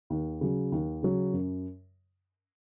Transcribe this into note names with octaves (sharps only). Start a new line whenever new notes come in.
D#2
C#3 F#3
D#2
C#3 F#3
F#2